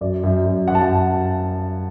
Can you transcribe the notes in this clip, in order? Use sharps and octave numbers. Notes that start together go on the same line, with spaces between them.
F#2 D5
F#2
F#2
F#2 F#5
A5
F#5